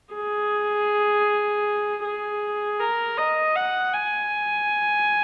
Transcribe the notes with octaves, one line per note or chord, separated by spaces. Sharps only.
G#4
G#4
A#4
D#5
F#5
G#5